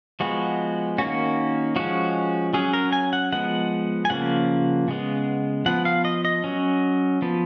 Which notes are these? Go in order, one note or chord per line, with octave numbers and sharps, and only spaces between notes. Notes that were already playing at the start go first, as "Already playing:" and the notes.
F3 G#3 B3 F#4
D#3 A#3 C#4 F#4
F3 G#3 C#4 F#4
F#3 C#4 G#4
A#4
G#5
F#5
F3 G#3 B3 F#5
G#5
C#3 F3 A#3 F#5
C#3 G#3 B3
F3 B3 F#5
F5
D#5
D#5
F#3 C#4
F3 B3